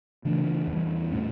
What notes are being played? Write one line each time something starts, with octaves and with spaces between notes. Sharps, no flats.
C#3 E3 A3 D4
E2 E3 G3
A#2 A3 C#4